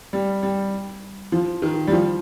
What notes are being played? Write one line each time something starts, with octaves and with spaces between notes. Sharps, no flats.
G3
G3
F3
D#3
G3
F3